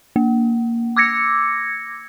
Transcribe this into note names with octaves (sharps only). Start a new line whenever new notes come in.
A#3
D6 E6 G#6 A#6 C#7